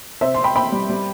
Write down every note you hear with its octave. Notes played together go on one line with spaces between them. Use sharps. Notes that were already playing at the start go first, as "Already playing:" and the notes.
C3 C5 E5
C4 C6
G5 B5
C4 G5 B5
G3
G3